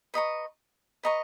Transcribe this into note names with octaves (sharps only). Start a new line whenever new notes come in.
B4 D#5 A#5 C#6
B4 D#5 A#5 C#6